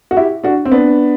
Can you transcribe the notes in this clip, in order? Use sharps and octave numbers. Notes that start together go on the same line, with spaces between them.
F#4
E4 G4
D4 F#4
C4
B3 D4